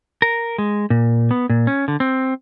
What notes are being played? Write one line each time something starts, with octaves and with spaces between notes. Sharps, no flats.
A#4
G#3
A#2
B3
A#2
C#4
D3
C4